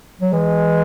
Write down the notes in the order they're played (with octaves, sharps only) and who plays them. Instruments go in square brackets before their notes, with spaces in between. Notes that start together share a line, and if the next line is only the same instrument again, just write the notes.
[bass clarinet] F#3
[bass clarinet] E3 [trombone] G#3